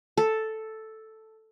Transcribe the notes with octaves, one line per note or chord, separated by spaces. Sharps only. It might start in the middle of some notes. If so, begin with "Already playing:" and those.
A4